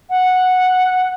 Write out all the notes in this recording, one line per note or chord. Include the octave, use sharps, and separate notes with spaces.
F#5